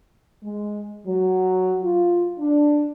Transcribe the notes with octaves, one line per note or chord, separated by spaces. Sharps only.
G#3
F#3
F4
D4